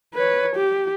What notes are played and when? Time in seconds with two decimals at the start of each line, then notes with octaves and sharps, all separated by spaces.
0.14 B4 C#5
0.56 G4